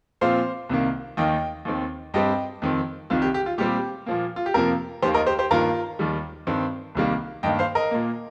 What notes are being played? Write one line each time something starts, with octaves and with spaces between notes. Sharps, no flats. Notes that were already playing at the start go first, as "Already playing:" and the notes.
A#2 F3 C4 C5 F5
C2 C3 D#3 A#3
D#2 D#3 A#3 D#5 G5
D#2 D#3 C4
G2 G3 C4 D#5 G5
F2 D#3 C4
C2 C3 D#3 F4
G4
G4
F4
A#2 G3 C4 G4
A#2 F3 A#3
F4
G4
F2 C3 F3 A#3 F4 A#4
D#2 D#3 A#3 G4 C5
A#4 D#5
G4 C5
G4 C5
G2 D#3 A#3 F4 A#4
D#2 D#3 G3
G2 D#3 C4
C2 C3 D#3 G3 A#3
G2 D#3 A#3 D#5 G5
C5 F5
A#4 D#5
A#2 A#3